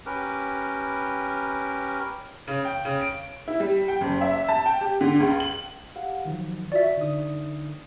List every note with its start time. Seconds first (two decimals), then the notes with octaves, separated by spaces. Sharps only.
0.06 C#4 G4 A#4 B4
2.48 C#3
2.65 G5
2.85 C#3
3.01 D7
3.48 E4
3.60 G3
3.88 G5
4.01 F#1
4.21 E5
4.49 A5
4.66 G5
4.81 G4
5.01 D3
5.20 C#2
5.40 F#7
5.96 G4 F5 F#5
6.25 D#3 F3 F#3
6.72 F4 F#4 D5 E5 C#6
6.97 D3 D#4 D#6